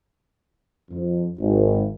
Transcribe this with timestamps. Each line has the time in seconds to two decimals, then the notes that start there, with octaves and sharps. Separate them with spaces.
0.91 F2
1.39 G#1